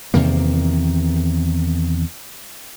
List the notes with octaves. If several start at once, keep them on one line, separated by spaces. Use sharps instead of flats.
E2 C3 D#3 A#3